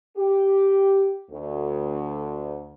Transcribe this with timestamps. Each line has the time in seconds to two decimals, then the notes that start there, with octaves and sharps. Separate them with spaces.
0.17 G4
1.31 D2